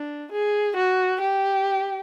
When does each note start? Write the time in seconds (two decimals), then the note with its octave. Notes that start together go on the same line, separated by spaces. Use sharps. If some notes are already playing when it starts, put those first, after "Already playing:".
Already playing: D4
0.32 G#4
0.76 F#4
1.21 G4